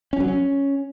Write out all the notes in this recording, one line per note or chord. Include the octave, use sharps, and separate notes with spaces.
C#4
F#3
C#4